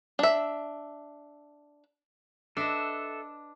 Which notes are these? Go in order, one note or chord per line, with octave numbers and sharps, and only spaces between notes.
D4 E5
D4 A4 B4 D#5 E5